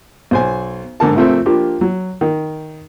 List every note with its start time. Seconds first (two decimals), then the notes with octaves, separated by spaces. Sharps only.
0.31 B1 C5 G#5
1.00 G#2 D3 A#4 A5
1.16 C3 F3 A3 A#3 C4
1.46 F3 A#3 D4 F4 G4
1.81 F#3
2.21 D#3